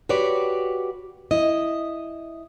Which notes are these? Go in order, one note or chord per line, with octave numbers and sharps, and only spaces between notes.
F#4 G4 B4 C#5 D5
E4 D#5